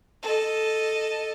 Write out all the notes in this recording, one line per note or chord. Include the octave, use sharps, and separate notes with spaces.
A4 D#5